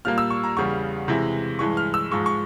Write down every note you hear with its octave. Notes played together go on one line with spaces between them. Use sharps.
A#2 G3 A#3 F6
E6
C#6
A#5
E2 C#3 G3 C#6
C3 E3 G#3 E4
G2 E3 G#3 C#6
F6
E6
G#2 F3 G#3 C#6
C#6